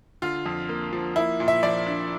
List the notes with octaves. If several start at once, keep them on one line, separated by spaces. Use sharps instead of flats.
D3 F4
F2
A#3
F3
A#3 E4
A#2
E5
F3 D5
D4